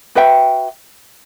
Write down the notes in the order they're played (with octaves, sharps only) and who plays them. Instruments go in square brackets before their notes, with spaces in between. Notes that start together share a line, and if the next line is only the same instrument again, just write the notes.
[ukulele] F#4 B4 E5 G5